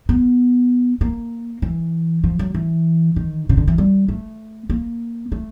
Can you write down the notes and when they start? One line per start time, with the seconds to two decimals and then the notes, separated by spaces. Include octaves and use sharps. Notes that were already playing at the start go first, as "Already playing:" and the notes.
0.09 B3
1.01 A#3
1.62 E3
2.24 F3
2.39 F#3
2.54 E3
3.16 D#3
3.49 C#3
3.57 D3
3.68 E3
3.78 G3
4.08 A3
4.70 A#3
5.32 A3